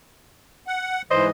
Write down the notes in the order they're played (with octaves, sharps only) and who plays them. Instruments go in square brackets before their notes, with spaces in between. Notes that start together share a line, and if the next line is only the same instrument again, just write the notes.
[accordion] F#5
[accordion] G#2 E3 [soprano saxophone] C5 [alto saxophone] D#5